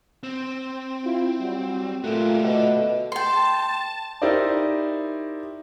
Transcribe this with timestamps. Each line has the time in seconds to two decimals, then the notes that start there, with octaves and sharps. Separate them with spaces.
0.23 C4
1.05 E4 F4
1.40 F#3 G3 F#4
2.04 A#2 F#3 A3 F4 G4
2.44 B2 D4 A4 D#5
3.12 G5 A5 C6
4.22 D#4 E4 G4 A#4 C5 D5